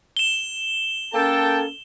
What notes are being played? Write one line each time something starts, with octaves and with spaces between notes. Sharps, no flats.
E7 G7
A#3 C#4 A4 G5 A5